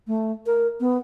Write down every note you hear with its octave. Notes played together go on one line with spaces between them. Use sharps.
A3
A#4
B3